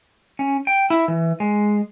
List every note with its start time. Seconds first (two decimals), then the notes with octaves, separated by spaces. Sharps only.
0.39 C#4
0.67 G5
0.90 E4
1.08 E3
1.40 G#3